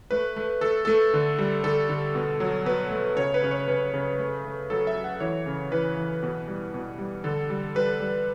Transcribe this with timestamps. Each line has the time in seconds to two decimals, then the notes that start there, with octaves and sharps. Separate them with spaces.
0.11 A3 B4
0.36 A3
0.61 A3 A4
0.85 A3 A4
1.14 D3
1.39 G3
1.63 D3 A4
1.89 D3
2.15 B2
2.40 F#3
2.66 B2 B4
2.91 A3
3.16 C#3 C#5
3.34 B4
3.42 C#3
3.51 C#5
3.68 C#3 B4
3.93 C#3
4.18 A3
4.45 A3
4.70 F#3 A4
4.87 E5
4.95 F#3
5.04 F#5
5.20 E3 C#5
5.46 C#3
5.72 E3 B4
5.97 E3
6.23 B2
6.48 G3
6.74 B2
6.98 G3
7.24 D3 A4
7.50 G3
7.75 G3 B4
8.00 G3